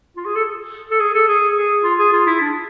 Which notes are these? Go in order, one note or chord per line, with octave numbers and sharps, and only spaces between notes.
F4
G#4
A4
A4
G#4
A4
G#4
G#4
F4
G#4
F4
E4
D4